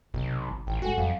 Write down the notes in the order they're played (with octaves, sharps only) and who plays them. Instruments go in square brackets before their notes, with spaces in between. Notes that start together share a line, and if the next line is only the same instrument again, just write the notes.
[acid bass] B1 [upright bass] C3
[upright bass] G#1
[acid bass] A1 [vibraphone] G5
[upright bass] A2 G#3 [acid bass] F#4 [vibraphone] A4 F#5 G#5
[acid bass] F2 [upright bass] F#3 [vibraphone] F5